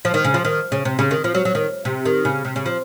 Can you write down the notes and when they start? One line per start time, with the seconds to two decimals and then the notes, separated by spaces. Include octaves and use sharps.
0.05 F3
0.14 D#3
0.24 C#3
0.34 F3
0.45 D#3
0.72 C#3
0.85 C3
0.99 C#3
1.11 D#3
1.24 F3
1.35 F#3
1.45 F#3
1.55 D#3
1.85 C3
2.05 D#3
2.25 C#3
2.45 C3
2.56 C#3
2.66 F3